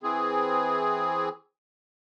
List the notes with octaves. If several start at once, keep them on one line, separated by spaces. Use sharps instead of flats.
E3 C4 G#4